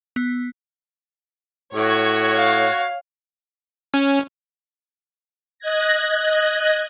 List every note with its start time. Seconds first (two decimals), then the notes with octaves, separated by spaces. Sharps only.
0.16 B3
1.75 A2 F#4 C#5
2.35 F5
3.94 C#4
5.59 D#5 F#6 G#6 A#6